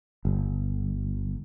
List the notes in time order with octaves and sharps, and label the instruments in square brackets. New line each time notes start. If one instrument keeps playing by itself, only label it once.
[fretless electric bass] G1